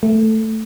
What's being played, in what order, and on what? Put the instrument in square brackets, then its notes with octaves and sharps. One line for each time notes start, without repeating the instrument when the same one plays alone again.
[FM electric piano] A3